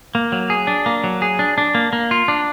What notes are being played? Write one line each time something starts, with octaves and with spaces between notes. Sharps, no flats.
A#3
F#3
G#4
D4
A#3
F#3
G#4
D4
D4
A#3
A#3
F4
D4